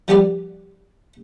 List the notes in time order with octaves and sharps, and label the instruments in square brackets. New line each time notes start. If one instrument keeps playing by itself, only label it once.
[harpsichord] F3 G3 B3 G4 B4 D5